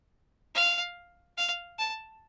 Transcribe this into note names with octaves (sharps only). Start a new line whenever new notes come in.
F5
F5
A5